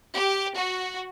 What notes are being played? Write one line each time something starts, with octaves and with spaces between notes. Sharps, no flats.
G4
F#4